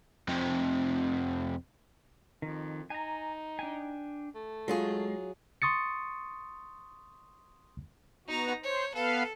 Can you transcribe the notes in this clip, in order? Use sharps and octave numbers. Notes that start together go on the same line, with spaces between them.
F2 C3
F2 D#3
D#4 G#5 A#5
D4 G5 G#5
A3
F#3 G#3 F4 G#4
C6 C#6 D#6 A6 C#7
B3 D#4 F#4 A#5
C5 C#5
B3 A4 B4 F5